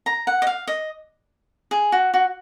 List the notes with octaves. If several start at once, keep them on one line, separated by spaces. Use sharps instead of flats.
A#5
F#5
D#5
F5
D#5
G#4
F#4
F#4